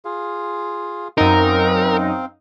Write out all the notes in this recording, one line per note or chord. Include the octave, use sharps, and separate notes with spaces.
F4 G#4 F5
F#2 C4 D#4 A#4 F5